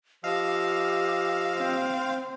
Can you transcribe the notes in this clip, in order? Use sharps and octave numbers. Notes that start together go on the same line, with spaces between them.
F3 G4 D#5 F5 E6
C4